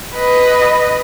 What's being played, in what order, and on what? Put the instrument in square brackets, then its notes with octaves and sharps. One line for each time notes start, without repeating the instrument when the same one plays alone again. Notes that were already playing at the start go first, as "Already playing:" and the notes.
[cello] B4 D#5